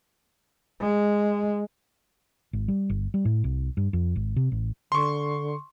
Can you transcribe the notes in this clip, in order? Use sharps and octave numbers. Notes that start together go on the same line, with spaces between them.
G#3
G#1
G3
G1
G3
A2
C2
G2
F2
G#1
C3
A1
D3 C6 C#6